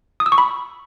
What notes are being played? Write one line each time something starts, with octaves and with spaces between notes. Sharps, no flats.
D#6
E6
C#6
B5